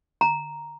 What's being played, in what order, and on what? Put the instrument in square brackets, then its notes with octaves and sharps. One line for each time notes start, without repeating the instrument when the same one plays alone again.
[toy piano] A#5